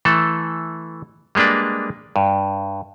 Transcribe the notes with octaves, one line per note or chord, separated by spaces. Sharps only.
E3 A3 A4
G3 G#3 A#3 D4 B4
G2